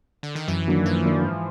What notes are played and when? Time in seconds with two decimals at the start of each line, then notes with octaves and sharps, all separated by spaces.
0.23 D3
0.35 D#3
0.48 F#2 E3
0.67 D#3 F#3 A#3 D4
0.85 F#2 F3
1.04 D#3 F#3 A#3 D4
1.23 G#2